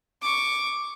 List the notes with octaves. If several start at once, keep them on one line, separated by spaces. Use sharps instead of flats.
C#6 D6